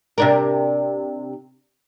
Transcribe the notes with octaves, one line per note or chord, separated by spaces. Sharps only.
C3 D4 A#4